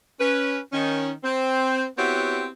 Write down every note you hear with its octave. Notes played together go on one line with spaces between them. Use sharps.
C#4 B4
D#3 C#4
C4
B3 C4 E4 F#4 G4 C#5